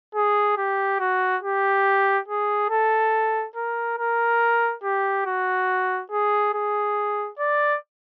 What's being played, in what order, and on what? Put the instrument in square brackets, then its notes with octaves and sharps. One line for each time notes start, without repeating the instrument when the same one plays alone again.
[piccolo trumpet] G#4
G4
F#4
G4
G#4
A4
A#4
A#4
G4
F#4
G#4
G#4
D5